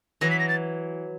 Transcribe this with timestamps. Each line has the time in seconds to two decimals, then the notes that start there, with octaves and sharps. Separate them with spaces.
0.21 E3 F#3 A#6
0.31 B6
0.39 A#6
0.49 A6